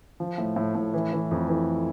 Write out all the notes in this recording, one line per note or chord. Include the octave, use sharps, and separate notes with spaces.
F3
A2
A2
A2
E3
E3
F2
E3